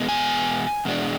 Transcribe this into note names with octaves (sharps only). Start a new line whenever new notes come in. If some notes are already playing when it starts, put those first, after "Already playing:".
Already playing: E2 B2 G#3 B3
G#5
E2 B2 G#3 D4